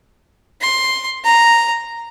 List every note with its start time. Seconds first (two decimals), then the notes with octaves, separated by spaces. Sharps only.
0.61 C6
1.25 A#5